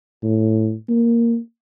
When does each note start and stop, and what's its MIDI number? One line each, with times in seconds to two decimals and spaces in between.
0.23 0.74 45
0.89 1.37 58